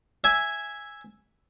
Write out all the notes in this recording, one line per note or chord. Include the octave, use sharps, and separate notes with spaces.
E5 G#5